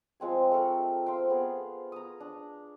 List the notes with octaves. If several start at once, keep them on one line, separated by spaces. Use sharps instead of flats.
F3 G#3 C4 G#5
A3 A4 A#4
C5 F5 G5
B3 G#4
A#5 D#6
D4